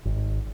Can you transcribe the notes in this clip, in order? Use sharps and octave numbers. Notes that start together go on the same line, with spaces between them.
G#1